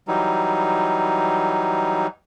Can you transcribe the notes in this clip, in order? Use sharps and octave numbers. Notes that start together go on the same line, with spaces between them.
E3 F#3 G3 D#4